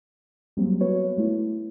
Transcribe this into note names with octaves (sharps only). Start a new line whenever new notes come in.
F#3 G3 A#3 C4
B3 F#4 B4 C#5
G#3 A3 E4